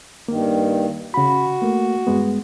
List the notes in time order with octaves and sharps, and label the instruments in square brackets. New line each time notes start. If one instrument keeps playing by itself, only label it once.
[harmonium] G2 D#3 [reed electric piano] A#3
[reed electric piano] C#3 B5 [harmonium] F#4
[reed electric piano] A3 A#3
G2 G#3 B3